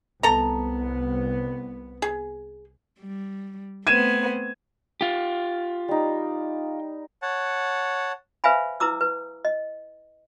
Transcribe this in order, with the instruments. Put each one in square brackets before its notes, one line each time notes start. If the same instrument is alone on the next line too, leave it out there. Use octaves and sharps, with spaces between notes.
[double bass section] C2 B3 [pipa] A4 A#5
[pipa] G#4
[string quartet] G3
[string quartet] A3 B3 C4 [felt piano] G#6 D#7 E7
[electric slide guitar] F4 G4
[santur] G3 D#4
[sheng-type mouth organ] C#5 F#5 A5
[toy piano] B4 C5 E5 F5 G#5 B5
E4 B4 A#5 D6 E6
B4
D#5